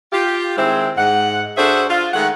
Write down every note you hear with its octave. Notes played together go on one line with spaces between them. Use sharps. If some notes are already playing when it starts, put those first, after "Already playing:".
F4 G4
D#3 G#3 C4 E4 C5
G#2 F#5
D4 F#4 G#4 A4 C5 E5
F4
D#3 G#3 A3 F#5